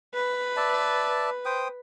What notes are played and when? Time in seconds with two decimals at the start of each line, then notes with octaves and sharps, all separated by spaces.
0.14 B4
0.57 D5 E5 A5
1.45 C5 G5 D#6